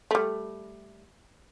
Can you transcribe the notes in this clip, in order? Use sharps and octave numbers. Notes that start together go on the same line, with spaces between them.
G3 A3